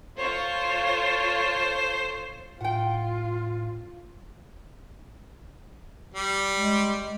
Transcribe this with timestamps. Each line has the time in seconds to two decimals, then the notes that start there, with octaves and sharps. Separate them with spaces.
0.18 F4 A4 C5 C#5
2.61 A2 F4 F#5 G5
6.14 G3
6.55 G#3